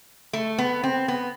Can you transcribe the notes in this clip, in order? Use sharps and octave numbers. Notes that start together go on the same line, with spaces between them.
A3
B3
C4
B3